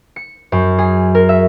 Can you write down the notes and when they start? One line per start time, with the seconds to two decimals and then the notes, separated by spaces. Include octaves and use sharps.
0.16 C#7
0.52 F#2
0.78 G#4
1.15 A#4
1.29 E5